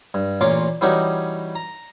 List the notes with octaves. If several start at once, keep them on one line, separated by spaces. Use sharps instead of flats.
G2
A1 A#2 C#4 F4 D6
E3 G3 C#4 D#4 F#4 G4
A#5